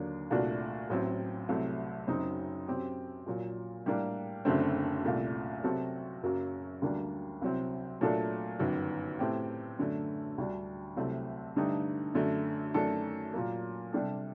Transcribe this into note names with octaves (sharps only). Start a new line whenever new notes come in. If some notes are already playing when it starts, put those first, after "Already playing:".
Already playing: D#2 D3 F#3 A#3 D4
C2 A#2 A3 D4 F#4
A1 A2 F#3 C4
C2 C3 F#3 A3
F#1 F#2 F#3 C4 D#4
F#2 F#3 C4 G4
A#1 A#2 F#3
A2 G3 A#3 D4
F#1 F#2 D3 A3 C4
C2 A#2 A3
C3 F#3 C4 F#4 A4
F#1 F#2 F#3 A#3 F#4
D2 D3 G3 A#3 D4
C2 C3 F#3 C4
A#2 F#3 A3 D4 A4
G1 F#2 D#3
A2 A3 C4 G4
F#2 D3 A3
D2 D3 G3 D4
C2 C3 F#3 A3 C4
G2 D3 A3 D#4 G4
F#2 D3 A3
F#2 D#3 A3 D4 A4
A#2 F#3 A#3
C3 G3 D4 A4